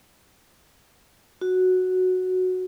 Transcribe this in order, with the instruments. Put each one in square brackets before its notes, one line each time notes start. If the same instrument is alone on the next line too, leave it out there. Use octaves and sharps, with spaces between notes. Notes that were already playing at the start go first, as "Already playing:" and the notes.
[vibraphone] F#4